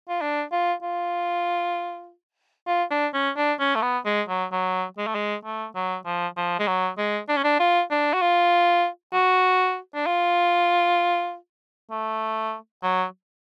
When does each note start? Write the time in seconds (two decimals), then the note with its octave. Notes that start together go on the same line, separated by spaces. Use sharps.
0.09 F4
0.22 D4
0.52 F4
0.83 F4
2.67 F4
2.91 D4
3.14 C#4
3.37 D4
3.60 C#4
3.75 A3
3.82 B3
4.06 G#3
4.29 F#3
4.52 F#3
4.98 G#3
5.07 A3
5.15 G#3
5.45 A3
5.75 F#3
6.06 F3
6.37 F3
6.60 G#3
6.68 F#3
6.98 G#3
7.29 D4
7.37 C#4
7.44 D4
7.60 F4
7.91 D4
8.14 F#4
8.22 F4
9.13 F#4
9.95 D4
10.07 F4
11.91 A3
12.83 F#3